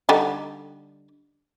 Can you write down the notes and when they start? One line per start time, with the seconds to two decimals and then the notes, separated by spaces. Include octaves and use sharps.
0.09 D3 G3 D#4